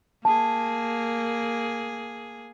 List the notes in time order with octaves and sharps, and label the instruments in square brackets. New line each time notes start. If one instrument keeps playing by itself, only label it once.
[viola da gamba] A#3 G#4 [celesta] A5